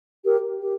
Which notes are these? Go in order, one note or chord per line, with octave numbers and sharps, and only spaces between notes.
G4 A#4
G4